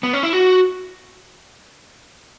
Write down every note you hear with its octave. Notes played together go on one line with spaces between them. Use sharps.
B3
C#4
E4
F#4